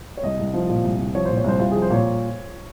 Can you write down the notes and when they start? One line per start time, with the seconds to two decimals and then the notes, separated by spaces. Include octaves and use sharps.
0.17 C#5
0.23 C2 D#5
0.39 C2
0.54 F3
0.69 A#2
0.84 C2
0.99 C2
1.15 F3 C#5
1.25 A#2 C5
1.37 C#5
1.44 C2 C5
1.59 C2 F4
1.71 F3 G#4
1.82 C5
1.90 A#2 C#5